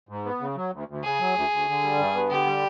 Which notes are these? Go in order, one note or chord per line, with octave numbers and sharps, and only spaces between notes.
G#2
B3
C#3
F#3
D2
D2
C#3 G#4
F#3
D2
D2
D3
G3
G2
B3
D3 G4
G3